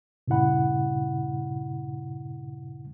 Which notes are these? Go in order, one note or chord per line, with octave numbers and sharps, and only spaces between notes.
G2 A#2 C#3 E4 F#5 B5